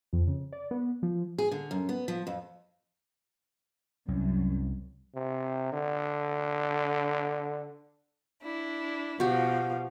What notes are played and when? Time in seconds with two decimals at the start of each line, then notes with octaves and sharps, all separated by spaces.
0.13 F2
0.27 C#3
0.53 D5
0.71 B3
1.03 F3
1.38 G#4
1.51 D3
1.71 F#2
1.89 B3
2.08 F3
2.27 F2
4.08 C2 F#2
5.15 C3
5.73 D3
8.42 D4 E4
9.20 B2 F3 F#4 G4 F5